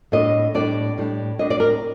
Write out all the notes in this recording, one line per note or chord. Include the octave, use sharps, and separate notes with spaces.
A2 G3 D4 D#5
A2 G3 D4 D5
A2 G3 D4
A2 G3 D4 D#5
D5
A#4